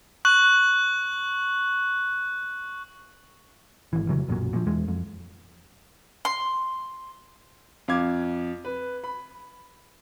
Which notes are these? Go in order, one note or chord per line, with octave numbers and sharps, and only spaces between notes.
C#6 F#6 F#7
G#1 E3
F2 C#3 E3 F#3
B1 F#2 A#2 F#3
A#2 F3
E2 E3 G#3
F2
C6
F2 F5 D6 G#6
B4
B5